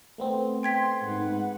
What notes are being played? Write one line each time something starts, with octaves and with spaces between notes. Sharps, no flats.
A3 B3 C4
G5 C6 G#6 B6
G#2 B4 F#5